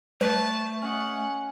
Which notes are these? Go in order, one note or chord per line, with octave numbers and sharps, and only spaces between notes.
G3 A3 B4 A5
C#4 D#5 F#5